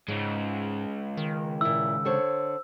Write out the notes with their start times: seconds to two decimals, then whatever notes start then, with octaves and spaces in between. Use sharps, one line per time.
0.08 G#2 C#3 G#3
1.17 D#3
1.61 A#2 E4 E6
2.05 D3 C5 C#5